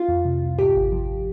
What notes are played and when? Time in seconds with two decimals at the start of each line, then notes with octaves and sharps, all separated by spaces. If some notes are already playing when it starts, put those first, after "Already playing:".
Already playing: F4
0.08 F2
0.25 C3
0.42 C2
0.58 G#2 G4
0.75 G#1
0.92 F3